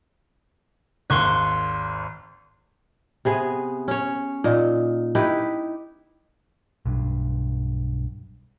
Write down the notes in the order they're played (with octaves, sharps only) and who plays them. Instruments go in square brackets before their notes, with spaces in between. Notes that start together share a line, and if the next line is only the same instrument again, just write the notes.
[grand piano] G#1 D#2 [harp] C6 C#6 F#6
[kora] C3 B3 G#4
C#4 C#5
A#2 D#4
D#4 E4 G4 B4
[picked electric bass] B1 G2